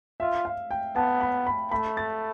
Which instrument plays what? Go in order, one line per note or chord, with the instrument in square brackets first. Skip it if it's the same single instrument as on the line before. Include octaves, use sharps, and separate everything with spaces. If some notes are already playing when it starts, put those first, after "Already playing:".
[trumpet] F4 [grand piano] E5
[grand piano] F5
G5
[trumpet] B3 [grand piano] A5
[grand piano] B5
B5
[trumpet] A3 [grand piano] B5
[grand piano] A6